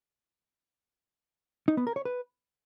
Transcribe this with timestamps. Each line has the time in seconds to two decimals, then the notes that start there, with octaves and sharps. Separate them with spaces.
1.68 D#4
1.77 B3
1.87 A#4
1.96 C#5
2.05 B4